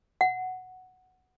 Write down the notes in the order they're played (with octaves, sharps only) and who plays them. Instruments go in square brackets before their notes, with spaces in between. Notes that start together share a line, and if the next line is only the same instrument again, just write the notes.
[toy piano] F#5